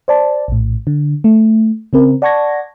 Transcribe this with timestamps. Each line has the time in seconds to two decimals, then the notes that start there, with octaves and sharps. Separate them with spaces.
0.08 C5 D5 A5
0.48 A#1 A2
0.87 D3
1.24 A3
1.93 C#3 C4 A#4
2.22 D5 F#5 A5 C#6 G#6 A#6